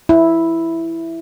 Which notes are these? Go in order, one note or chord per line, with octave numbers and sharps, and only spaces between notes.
E4